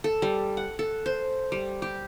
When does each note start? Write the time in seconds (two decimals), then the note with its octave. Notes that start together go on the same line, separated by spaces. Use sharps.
0.04 A4
0.22 G3
0.57 F#5
0.79 A4
1.06 C5
1.52 G3
1.82 G4